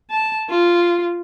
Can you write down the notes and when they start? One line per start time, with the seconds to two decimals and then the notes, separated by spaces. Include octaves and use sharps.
0.11 A5
0.50 F4